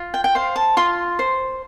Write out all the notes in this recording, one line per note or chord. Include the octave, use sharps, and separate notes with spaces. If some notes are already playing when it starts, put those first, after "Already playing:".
Already playing: F4
G5
G5
C5 F5
A5
F4 C6
C5